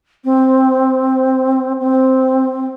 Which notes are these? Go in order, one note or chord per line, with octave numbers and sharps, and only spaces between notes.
C4
C4